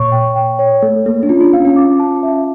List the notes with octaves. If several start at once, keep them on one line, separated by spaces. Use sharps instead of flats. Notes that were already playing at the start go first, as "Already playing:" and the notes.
Already playing: A#2 C#5 C#6
G5
G5
C#5
A3 A4
A#3 A4
D4
C#4 F4
D4
C#4 F5
C#4
D6
A5
E5